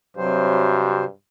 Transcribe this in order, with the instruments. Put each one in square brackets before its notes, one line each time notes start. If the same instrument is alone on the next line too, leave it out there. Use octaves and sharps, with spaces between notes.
[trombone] G2 [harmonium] C3 F#3 C5